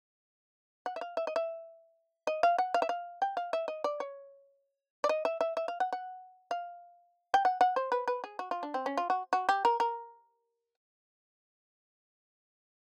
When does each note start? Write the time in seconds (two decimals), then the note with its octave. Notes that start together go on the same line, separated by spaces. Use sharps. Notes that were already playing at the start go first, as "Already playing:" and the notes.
0.86 F#5
0.96 E5
1.01 F5
1.17 E5
1.27 D#5
1.36 E5
2.27 D#5
2.43 F5
2.58 F#5
2.74 F5
2.82 E5
2.89 F5
3.22 G5
3.37 F5
3.53 E5
3.68 D#5
3.84 D5
4.00 C#5
5.04 D5
5.09 D#5
5.25 E5
5.41 E5
5.57 E5
5.68 F5
5.80 F#5
5.93 F#5
6.51 F5
7.34 G5
7.45 F#5
7.61 F#5
7.76 C5
7.92 B4
8.08 B4
8.24 G#4
8.39 F#4
8.51 F4
8.63 D4
8.74 C4
8.86 C#4
8.97 F4
9.10 F#4
9.33 F#4
9.49 G4
9.65 A#4
9.80 A#4